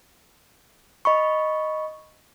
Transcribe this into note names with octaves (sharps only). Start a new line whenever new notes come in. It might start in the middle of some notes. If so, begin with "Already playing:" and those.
D#5 B5 C#6